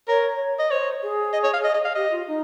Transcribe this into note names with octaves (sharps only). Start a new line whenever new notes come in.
A#4 C#5
D#5
C5 C#5
G#4
D#5
C#5
F5
D#5
D#5
F5
G4 D#5
F4
D#4